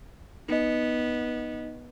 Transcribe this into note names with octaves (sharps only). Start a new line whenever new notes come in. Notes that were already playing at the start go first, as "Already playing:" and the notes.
B3 D#4 D#5